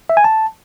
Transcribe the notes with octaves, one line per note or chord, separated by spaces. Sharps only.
E5
G#5
A5